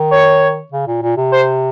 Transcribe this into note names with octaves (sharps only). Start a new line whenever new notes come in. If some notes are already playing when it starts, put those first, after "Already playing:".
Already playing: D#3
C#5
C#3
A#2
A#2
C3
C5